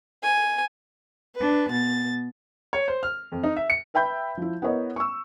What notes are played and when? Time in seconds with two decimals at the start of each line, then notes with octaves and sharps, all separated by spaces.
0.23 G#5
1.36 D4 B4
1.69 B2 A6
2.73 C#5
2.88 C5
3.03 F6
3.32 F2
3.43 D#4
3.56 E5
3.70 C#7
3.94 B4 E5 G5 B5 G6
4.37 F3 E4
4.62 B3 E4 A#4 C#5 D#5
4.96 C#6 E6